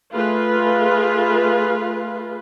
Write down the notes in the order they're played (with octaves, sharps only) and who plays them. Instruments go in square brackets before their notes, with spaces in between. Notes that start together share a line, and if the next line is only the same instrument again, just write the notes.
[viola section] A3 F4 G#4 B4